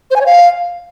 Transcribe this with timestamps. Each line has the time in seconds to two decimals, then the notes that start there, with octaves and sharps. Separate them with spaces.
0.11 C5
0.16 G#5
0.21 C#5
0.26 F5